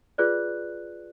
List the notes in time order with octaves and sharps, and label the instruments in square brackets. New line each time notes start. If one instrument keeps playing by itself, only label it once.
[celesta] F4 G#4 B4 D5 F#6